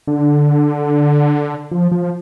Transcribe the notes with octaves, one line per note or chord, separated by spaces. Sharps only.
D3
F3
F3